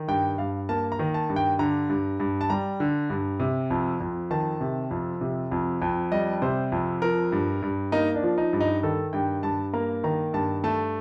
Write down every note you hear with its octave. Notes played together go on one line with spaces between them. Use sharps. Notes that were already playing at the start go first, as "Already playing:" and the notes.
Already playing: D#3
G2 G5
G2 F5
A#3 A5
A#5
D#3
A5
G2
G5
D3 A#5
G2
G2
A5
G3 A#5
D3
G2
C3
F2
F2
D#3 A5
C3
F2
C3
F2
F2
G3 D#5
C3 C5
F2
F3 A#4
G2
G2
A#3 D#4
D4
F3
D#4
G2
D#4
D#3 A4
G2 G5
G2 A5
A#3 A#5
D#3 A#5
G2 A5
A3 A5